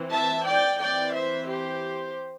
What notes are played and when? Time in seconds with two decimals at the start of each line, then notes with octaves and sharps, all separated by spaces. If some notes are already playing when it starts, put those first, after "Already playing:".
Already playing: E3 C4
0.11 E5 A5
0.46 D5 G5
0.80 E3 C4 D5 G5
1.14 C5 E5
1.48 G4 C5